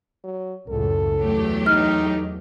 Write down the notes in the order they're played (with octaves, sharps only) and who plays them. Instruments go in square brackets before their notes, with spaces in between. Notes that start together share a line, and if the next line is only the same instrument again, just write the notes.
[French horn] F#3
[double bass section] C#2 F#2 A2 [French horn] A4
[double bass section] E2 [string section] F#3 A3 G4
[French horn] D#4 [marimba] F6